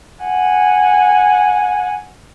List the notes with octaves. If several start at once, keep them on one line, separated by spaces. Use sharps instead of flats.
F#5 G#5